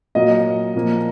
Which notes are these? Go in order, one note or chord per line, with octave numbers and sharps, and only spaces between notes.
A#2 F#3 A#3 D#5
A#2 F3 A#3